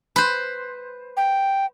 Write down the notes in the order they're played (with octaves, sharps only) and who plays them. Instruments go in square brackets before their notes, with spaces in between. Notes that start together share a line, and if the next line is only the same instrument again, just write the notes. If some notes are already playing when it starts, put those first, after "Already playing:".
[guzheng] B4 C5
[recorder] G5